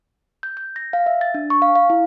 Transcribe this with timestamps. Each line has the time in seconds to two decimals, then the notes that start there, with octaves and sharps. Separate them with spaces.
0.43 G6
0.57 G6
0.76 A#6
0.93 F5
1.06 E5
1.21 A6
1.34 D4
1.50 C#6
1.62 F5
1.76 F5
1.90 E4